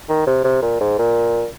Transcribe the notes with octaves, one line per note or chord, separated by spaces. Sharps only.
D#3
C3
C3
A#2
G#2
A#2